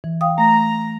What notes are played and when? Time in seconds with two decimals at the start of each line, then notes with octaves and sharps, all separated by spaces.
0.04 E3
0.21 F5 G5 D#6
0.38 A3 A#5